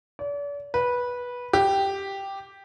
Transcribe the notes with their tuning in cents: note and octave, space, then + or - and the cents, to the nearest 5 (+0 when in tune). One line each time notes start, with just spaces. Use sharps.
D5 -40
B4 -15
G4 +0